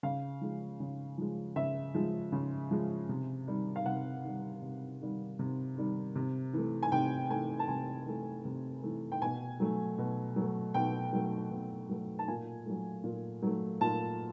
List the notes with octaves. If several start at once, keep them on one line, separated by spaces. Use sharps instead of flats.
C#3 F5
F3 G#3
C#3
F3 G#3
C#3 E5
F3 G#3
C#3
F3 G#3
C3
D#3 G3
F5
C3 F#5
D#3 G3
C3
D#3 G3
C3
D#3 G3
C3
E3 A3
G#5
C3 G5
E3 A3 G#5
A5
C3 G#5
E3 A3
C3
E3 A3
G5
B2 G#5
F#3 A3
B2
F#3 A3
B2 G5
F#3 A3
B2
F#3 A3
A5
A#2 G#5
F#3 A3
A#2
F#3 A3
A#2 A5